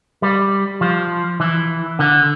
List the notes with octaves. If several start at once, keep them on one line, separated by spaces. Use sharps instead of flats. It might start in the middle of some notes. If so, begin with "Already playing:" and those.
G3
F3
E3
D3